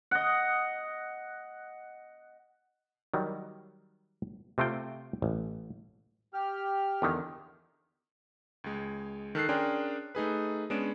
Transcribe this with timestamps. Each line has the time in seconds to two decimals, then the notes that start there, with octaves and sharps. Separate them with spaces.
0.11 D#5 F#5
3.14 D#3 F#3 G3
4.58 C3 A3 C4 F4 G5
5.22 A1
6.34 G4 F6
7.02 E2 D3 D#3
8.64 C#2 G#3
9.35 D#3 A4 F#6 C7
9.49 C#4 D4 G#4 A#4 G5 C6
10.15 A3 D#4 G#4 B4
10.70 G#3 B3 C#4 D4 D7 E7